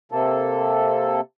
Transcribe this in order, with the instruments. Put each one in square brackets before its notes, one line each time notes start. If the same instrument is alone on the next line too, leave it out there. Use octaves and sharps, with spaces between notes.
[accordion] C3 A#3 A4